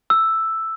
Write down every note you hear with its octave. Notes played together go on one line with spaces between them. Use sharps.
E6